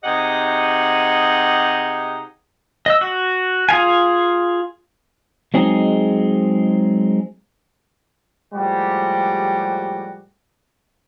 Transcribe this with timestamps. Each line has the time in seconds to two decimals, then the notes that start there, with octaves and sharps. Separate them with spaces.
0.04 C3 D#4 G4 G#4 D#5 F#5
2.86 D#5 E6
3.01 F#4
3.69 F4 G#4 F5 G#5
5.54 F#3 G#3 C4 D#4 G#4
8.54 A2 F3 G3 G#3 F#4 G4